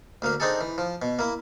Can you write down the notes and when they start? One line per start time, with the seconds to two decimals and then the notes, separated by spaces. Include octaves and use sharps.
0.22 D2 A#3 F5
0.40 C4 D4 D#4 G#4 A4
0.61 E3
0.78 F3
1.02 B2
1.19 A#3 E4